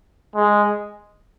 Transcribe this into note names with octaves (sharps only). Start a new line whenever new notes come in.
G#3